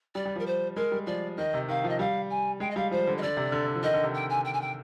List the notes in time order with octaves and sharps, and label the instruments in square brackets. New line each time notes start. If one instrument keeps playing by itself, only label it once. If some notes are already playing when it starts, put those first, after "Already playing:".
[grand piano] G3 [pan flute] D5
[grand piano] G3
[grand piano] F3 [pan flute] A#4
[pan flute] C5
[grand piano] G#3 [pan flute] A#4
[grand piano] G3
[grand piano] F3 [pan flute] D5
[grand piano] D#3 [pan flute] D#5
[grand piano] C3
[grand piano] D#3 [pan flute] F5
[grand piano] F3 [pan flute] D#5
[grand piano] G3 [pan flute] F5
[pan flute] G#5
[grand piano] G#3 [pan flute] G5
[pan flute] D#5
[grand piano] G3 [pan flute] F5
[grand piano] F3 [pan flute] C5
[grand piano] D3
[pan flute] D#5
[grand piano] D3 [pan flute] D5
[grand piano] C3
D3
F3
[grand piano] D#3 [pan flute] D#5
[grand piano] D3
C3
[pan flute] G5
G#5
G5
G#5
G5